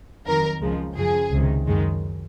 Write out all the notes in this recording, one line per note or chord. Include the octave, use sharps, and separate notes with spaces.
F2 D#3 F#3 A#4
C#2 C#3 F3 G#3
F#2 C#3 F3 G#4
C#2 C3 D#3
F#2 D#3 G#3